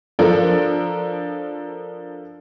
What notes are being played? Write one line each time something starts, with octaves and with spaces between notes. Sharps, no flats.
F3 D4 A4 A#4